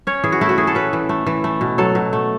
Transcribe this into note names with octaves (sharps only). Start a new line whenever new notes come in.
C#4 C#5
E3 G#4
F#4
A3 E4
F#4
E3 G#4
A4
C#4 B4
E3
A3
E3
A3
B2
F#3 A4
B2
A3